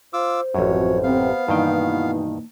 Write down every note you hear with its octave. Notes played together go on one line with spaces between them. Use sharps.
F4 C5 D6 E6
A1 F#2 F3 C4 F#4 C#5
C3 B3 F5
G2 B2 D#3 E3 A#3 D#4 G5